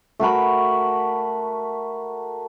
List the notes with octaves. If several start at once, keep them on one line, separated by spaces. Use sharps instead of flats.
A3 F#4 A#4 B5